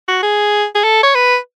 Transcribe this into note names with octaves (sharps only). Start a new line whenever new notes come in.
F#4
G#4
G#4
A4
C#5
B4